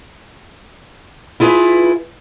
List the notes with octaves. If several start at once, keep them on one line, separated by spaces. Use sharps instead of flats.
E4 F4 G#4 B4